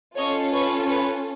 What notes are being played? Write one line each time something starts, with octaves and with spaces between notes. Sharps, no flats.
C#4 F4 A4 C#5 D#5
B4 C#5
B4 C#5